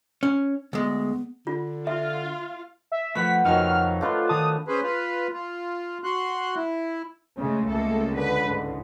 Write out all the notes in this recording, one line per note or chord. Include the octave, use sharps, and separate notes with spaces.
C#4
D2 G#3 B3
D3 F4
F4 E5 F5
E5
F3 A3 B4 F#5 B6
F2 D#3 F3 F#3 D#4 F6
A3 D4 F4 B4
D#3 A5 D#6
C#4 G#4 B4 C5
F4 B4
F4
F#4 C6 F#6
E4
C#3 G#3 A3
C#2 C#3 A3 A#3 A4
D3 B4
G#2 D3